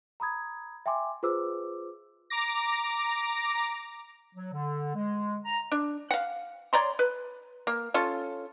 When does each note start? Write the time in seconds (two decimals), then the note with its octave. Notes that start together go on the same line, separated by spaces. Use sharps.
0.20 A#5 B5 D#6 G#6
0.86 E5 G5 G#5 C6 D6
1.23 F4 G#4 B4 C5 D6 E6
2.30 A#5 D6 A#6
4.35 F#3
4.52 D3
4.95 G#3
5.45 A#5
5.72 D4
6.11 F5 F#5
6.73 C#5 D5 A#5 C6
6.99 B4
7.67 A#3
7.94 C#4 F4 A4